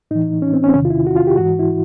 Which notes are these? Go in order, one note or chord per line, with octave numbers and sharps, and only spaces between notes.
A2 E3 D#4
C#4
C4
C#4
C4
E2 C3 D#3 C#4
F4
E4
F#4
F4
G4
G#2 E3 F#4
E4